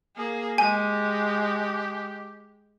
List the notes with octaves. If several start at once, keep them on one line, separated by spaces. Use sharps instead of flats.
A#3 G#4
G#3 G4 G#5